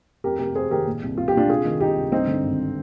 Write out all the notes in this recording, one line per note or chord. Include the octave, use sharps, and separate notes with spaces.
F2 G4 A#4
C3 G4 A#4
F1 G#4 C5
D#3 G4 A#4
A#2
C2
C2 F4
G4
A#2 D4 F4
C3 F4 G#4
D#3
C2 D#4 G4
C2
G2 C4 D#4
D3
G#1